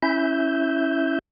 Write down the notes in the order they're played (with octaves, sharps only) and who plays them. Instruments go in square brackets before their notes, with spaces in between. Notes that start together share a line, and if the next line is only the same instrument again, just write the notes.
[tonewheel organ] C#4 E4 E5 G6